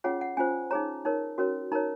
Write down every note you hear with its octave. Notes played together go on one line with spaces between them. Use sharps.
C#4 F4 G#4 C#5 F#5
F#5
C#4 F4 C5 G#5
D#4 G#4 C#5 A#5
D#4 A#4 C#5
C#4 F#4 A#4 C#5
D#4 A#4 C#5 A#5